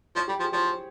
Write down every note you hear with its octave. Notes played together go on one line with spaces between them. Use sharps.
F3 C#5
G3 G4
F3 G#4
F3 C#5
C5